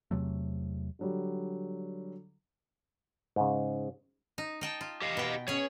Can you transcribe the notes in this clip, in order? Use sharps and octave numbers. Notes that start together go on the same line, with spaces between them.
E2 C3 F#3 A3
D3 F#3 G3
G#2 C#3
D#4
D#4 G5 A5
F4
G4 D#5 F5
B2 G5
C#4 G#4 C#5